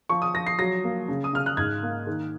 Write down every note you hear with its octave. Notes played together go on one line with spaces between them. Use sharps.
F3 C#6
D#6
F3 A#6
C7
F#3 A#6
A#3
C#3
D#6
C#3 F6
F#6
G#2 G#6
A#3
D#3